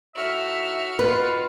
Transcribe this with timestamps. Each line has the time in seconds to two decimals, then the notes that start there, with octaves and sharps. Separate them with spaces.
0.15 A2 D#4 F#4 E5 F6
0.99 D#3 D4 F4 B4